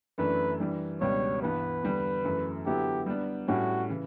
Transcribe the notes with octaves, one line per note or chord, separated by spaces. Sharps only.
F#2 E3 A3 D4 B4
E3 G3 D4
C#2 B2 G3 D4 G4 C#5
G2 E3 B3 B4
E2 D3 G3
F#2 E3 A3
D3 F#3 B3 E4 G4 A4
G3 B3 D4
A2 G3 C#4 E4 F#4 G4
C#3 E3